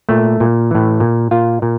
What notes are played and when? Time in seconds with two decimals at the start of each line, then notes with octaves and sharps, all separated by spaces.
0.09 A#2 A3
0.40 A#2
0.71 A2 E3
1.00 A#2
1.31 A#2 F4
1.62 A#2